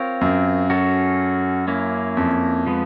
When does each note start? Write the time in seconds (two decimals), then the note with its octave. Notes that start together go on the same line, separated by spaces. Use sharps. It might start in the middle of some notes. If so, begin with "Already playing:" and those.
Already playing: C4 F4 A#4 C#5
0.21 F#2
0.70 C#4 F#4 A4
1.68 A#3 C#4 E4
2.17 F2
2.66 F3 G#3 B3